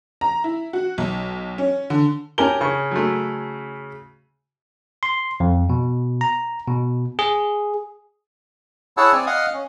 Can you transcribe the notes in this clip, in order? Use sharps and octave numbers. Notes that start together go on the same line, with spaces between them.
A#5
E4
F#4
B1
C#4
D3
C#4 G4 A#4 G#5 A5 G7
C#3 C#6
F#3 A3
C6
F2
B2
A#5
B2
G#4
E4 G#4 C#5 F#5 A5 E6
C4 D5 G#5
D#5 F5 F#5 D#6
C#4